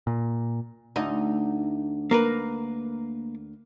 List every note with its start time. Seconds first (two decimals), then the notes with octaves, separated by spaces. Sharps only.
0.07 A#2
0.96 D2 D#4
2.11 A#3 A#4 B4